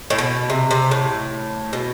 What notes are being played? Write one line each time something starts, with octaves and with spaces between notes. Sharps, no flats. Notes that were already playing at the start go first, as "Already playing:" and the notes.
A2
B2
C3
C3
A2
B2